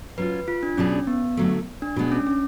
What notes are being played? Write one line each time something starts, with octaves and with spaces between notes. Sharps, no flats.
F#3 C#4 F4 B4
F4
D4
B2 F#3 B3 C#4 D4 G#4
B3
D3 F#3 A3
D4
B2 G#3 B3 D4
C#4
C#4